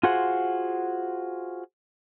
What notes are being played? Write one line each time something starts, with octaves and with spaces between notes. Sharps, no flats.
F4 F#4 G#4 C5 F#5